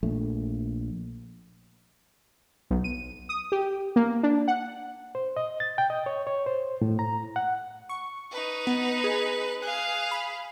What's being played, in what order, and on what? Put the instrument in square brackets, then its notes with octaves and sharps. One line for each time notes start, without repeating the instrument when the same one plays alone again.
[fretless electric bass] A#1 A3
[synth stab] B1
D#7
D#6
G4
A#3
D4
F#5
[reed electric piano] C5
D#5
A6
G5
D#5
C#5
C#5
C5
A2
A#5
F#5
[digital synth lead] C#6
[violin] D#4 B4
[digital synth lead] B3
G#4
[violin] G#4 F5 [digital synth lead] F#6
[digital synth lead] B5